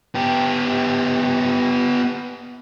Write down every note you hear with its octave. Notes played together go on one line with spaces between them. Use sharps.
B3 G4